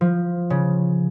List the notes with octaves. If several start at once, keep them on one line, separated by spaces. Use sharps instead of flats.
F3
C#3